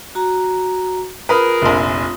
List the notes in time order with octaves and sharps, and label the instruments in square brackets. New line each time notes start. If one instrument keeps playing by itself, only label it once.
[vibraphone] F#4 A#5
[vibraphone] F4 D#6 [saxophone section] G#4 A#4 [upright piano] B4
[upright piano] F1 A#1